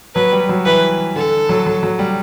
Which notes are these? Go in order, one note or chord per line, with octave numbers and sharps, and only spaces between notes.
F#3 B4
G3
F#3
E3 B4
D3 A4
F#3
F#3
F#3
G3